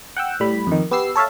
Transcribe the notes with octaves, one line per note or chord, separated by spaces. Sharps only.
F#5 G5 E6
A2 G3 B5
F2 D#3
B3 G4 E6 C7
A4 C#5 E5 F5 A5